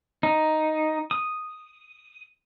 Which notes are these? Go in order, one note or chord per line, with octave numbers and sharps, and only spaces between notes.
D#4
D#6